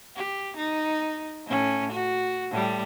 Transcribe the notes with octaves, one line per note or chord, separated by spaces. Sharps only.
G4
D#4
A2 C#4
F#4
A2 G3